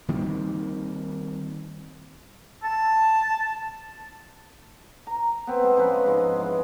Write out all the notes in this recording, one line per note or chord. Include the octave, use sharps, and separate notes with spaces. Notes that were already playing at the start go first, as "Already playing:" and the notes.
D#3 G3 A#3 C4
A5
A#5
B3 C4
G#3
F3 G#3 C#4 B4
G#2 G#3 D#5
E3 G#3